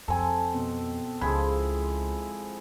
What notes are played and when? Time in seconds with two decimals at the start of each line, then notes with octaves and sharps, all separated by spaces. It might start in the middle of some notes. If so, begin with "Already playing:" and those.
0.08 F2 C4 A4 G#5 A#5
0.54 B2
1.21 C#2 C#3 F3 G#3 E4 B5 G#6